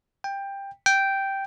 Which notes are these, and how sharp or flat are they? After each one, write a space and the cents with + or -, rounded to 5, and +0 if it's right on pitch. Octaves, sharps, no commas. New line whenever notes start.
G5 +15
G5 -5